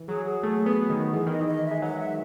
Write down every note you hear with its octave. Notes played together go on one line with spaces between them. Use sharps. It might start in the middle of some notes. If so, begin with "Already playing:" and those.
Already playing: E3
F#3 G#4
G#4
A3
B3
D#3
E3 G#4
D#3 D#5
E3
D#5
E5
G#3
F#3 F#5
E5